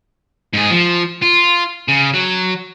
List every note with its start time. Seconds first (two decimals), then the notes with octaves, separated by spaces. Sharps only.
0.53 G#2 G#4
0.71 F3
1.22 F4
1.88 C#3
2.14 F#3